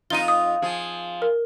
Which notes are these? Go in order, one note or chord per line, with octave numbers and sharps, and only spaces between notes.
F2 D#4 F4 D#7 G7
D#6
F3 G#4
A#4